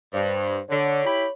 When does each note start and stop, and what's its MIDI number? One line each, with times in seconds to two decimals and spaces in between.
0.14 0.58 43
0.14 0.62 72
0.70 1.01 50
0.70 1.33 73
1.05 1.26 64
1.05 1.26 67
1.05 1.26 83